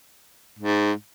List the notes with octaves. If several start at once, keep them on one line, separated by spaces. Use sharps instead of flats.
G#2